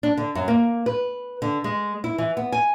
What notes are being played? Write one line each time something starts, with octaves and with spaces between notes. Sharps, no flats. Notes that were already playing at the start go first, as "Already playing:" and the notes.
D4
D3
F#2
A#3
B4
D3
G#3
E4
E3
B3
G#5